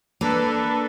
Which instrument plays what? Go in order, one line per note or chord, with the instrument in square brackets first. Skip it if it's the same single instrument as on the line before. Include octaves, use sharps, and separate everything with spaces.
[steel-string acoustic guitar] A#3 [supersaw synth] D4 A4 B4